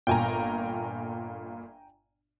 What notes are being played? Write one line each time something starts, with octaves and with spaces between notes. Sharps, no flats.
G1 A#2 G5 G#5 A#5